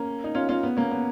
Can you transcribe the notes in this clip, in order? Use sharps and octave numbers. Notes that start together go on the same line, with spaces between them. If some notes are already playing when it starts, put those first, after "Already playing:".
Already playing: A#3 C#4
D#4
C#4 F4
C#4 F4
B3
A#3 C#4
B3